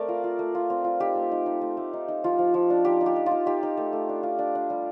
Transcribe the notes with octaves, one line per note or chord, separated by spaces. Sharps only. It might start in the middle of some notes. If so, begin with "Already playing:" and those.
Already playing: A3 C4 A#4 D5
F4
F4
A3
F4
C4
F4
D#4 G4
A3
D#4
D#4
A3
A3
D#4
D#4
F3 F4
F3
F3
D4
D#4 G4
D#4
G4
D#4
D#4 F4
D#4 G4
D#4
A3
A3
D4
F4
D4
D4
G3